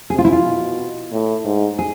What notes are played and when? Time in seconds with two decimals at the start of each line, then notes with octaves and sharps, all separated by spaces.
0.10 C3 G#4
0.18 F4
0.25 E4
0.32 F4
0.45 B2
1.11 A2
1.44 G#2
1.79 G#4